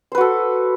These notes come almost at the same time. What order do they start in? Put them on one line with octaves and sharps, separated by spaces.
C5 B4 F#4 A4